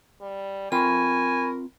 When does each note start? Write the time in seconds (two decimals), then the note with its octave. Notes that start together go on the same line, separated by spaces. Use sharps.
0.21 G3
0.72 C4 F4 A#4 G5 G#5 B5 C#6